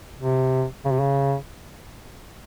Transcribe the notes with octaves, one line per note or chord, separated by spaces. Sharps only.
C3
C#3
C3
C#3